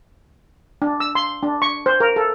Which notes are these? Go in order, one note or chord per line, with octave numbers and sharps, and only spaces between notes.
D4
E6
C6
D4
C#6
C5
A#4
A4